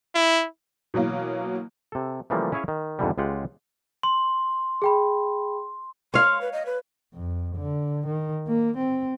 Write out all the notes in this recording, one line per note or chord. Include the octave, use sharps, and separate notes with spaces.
E4
B2 E3 F#3 A#3
C3 A4
C#3 E3 F3 G3 A3 A#3
C#4 E4 G#4 C#5 F5 G#5
D#3
F2 G#2 B2 D3 E3 G3
C#2 G#3 F4 G4 F#5
C6
G#4 G5 B5
C#5 F5 C6
B4
D#5
B4
F2
D3
D#3
A#3
C4